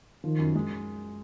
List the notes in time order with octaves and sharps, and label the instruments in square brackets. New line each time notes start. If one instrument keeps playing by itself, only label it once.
[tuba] D#3 [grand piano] F3
[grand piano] F#2
G#3